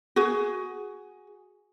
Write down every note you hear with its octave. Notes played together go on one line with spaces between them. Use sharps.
F#4 G#4